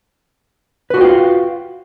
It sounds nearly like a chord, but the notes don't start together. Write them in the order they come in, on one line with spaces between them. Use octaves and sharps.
B4 F#4 F4 G5 F5